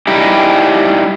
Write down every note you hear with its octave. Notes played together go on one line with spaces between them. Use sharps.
G3 D#4 E4 G4